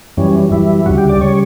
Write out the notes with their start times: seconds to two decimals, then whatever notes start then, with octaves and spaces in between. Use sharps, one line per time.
0.17 F#2 E3 G3 C#4
0.52 F#2 E3 G3 E4
0.86 D2 C#3 G3 F#4
0.98 G4
1.09 D5
1.21 C#3 G3 C#5